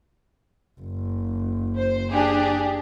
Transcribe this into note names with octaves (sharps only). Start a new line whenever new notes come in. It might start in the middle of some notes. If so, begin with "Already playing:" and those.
F#1
C5
D4 G4 G#4